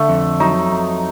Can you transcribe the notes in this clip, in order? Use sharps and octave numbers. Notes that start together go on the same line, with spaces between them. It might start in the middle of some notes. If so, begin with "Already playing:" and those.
Already playing: D3 A3
F2
F#3 D#4
F2